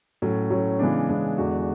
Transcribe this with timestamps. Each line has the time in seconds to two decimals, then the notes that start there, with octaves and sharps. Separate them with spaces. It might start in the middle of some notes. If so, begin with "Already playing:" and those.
0.22 A2 F#3 C#4
0.50 A2 F#3 C#4
0.79 C#3 E3 G#3 B3 D4
1.09 C#3 E3 G#3 B3 D4
1.38 E2 D3 G#3 D4 F#4